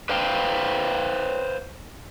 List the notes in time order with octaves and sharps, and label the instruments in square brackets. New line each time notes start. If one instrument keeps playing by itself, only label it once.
[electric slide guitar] B4 C5 F5 G5